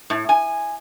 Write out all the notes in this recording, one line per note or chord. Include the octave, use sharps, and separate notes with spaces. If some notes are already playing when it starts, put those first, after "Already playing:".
A2
G#5